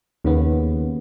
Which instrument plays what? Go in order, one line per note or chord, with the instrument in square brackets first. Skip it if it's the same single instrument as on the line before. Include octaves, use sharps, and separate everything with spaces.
[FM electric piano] D#2 C#3 B3